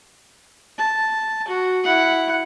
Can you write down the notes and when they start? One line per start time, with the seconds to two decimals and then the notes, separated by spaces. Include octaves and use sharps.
0.78 A5
1.48 F#4
1.84 E4 F#5